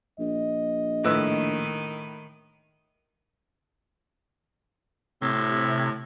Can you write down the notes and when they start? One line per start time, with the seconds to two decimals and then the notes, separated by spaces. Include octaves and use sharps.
0.19 A#1 D#5
1.04 A2 D#3 B4 E6
5.22 A2 C3